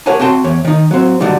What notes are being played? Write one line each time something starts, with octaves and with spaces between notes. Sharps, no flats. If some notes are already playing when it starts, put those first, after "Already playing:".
G4 A#4 C#5 F#5 G#5 A5
C4 F#4 G5 A5 C6
E2 C#5
D#3 D#4
F#3 C4
D3 F#3 G3 D#4